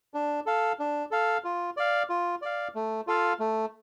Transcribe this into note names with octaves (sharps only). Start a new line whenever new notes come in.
D4
A4 F5
D4
A4 F5
F4
D5 F5
F4
D5 F5
A3
F4 A4 F5
A3